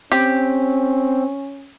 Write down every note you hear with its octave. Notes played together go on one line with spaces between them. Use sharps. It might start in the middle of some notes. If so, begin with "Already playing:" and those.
C4 C#4 G4